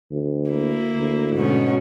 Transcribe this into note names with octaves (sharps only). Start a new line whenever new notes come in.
D2
A#3 E4
D2
G#2 B2 C#4